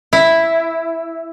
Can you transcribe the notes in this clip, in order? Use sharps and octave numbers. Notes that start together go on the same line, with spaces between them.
E4